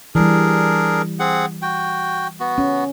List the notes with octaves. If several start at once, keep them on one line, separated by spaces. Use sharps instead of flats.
E3 G3 D4 G#4 A#4
C4 G#4 F#5
F#4 G5
B3 F#4
C#4